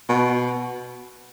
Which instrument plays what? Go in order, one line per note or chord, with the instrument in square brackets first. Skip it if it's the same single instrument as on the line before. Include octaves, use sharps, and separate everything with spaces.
[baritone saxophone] B2